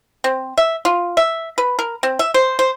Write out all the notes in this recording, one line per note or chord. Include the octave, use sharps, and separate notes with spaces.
C4
E5
F4
E5
B4
A#4
C4
E5
C5
C5